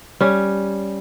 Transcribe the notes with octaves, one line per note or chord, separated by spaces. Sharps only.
G3 C#4